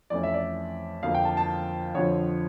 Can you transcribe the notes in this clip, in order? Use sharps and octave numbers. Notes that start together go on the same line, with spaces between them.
F2 E3 A3 C#4 D5
E5
D5
F2 D3 F3 A#3 F5
G5
A5
A5
F2 D3 F3 C#5